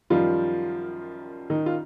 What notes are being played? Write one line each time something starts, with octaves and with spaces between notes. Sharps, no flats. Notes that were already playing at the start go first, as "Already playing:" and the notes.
F#2 D#3 F3 G3 F4
D#3 D#4
F4